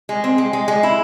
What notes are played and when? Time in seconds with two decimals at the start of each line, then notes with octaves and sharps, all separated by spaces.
0.09 G#3
0.24 C4
0.38 G#3
0.53 G#3
0.68 G#3
0.83 E4